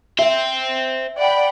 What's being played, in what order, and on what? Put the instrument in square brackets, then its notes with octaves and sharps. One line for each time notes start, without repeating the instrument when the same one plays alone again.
[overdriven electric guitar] C5 G5 [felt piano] E5
[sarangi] D5 [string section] F#5 G5 B5